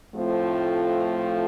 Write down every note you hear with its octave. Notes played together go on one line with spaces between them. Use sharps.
A2 F3 A3 C4 F4